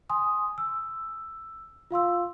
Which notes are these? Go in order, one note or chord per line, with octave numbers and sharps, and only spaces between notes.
G#5 C6 D#6
E6
F4 F5 C6 E6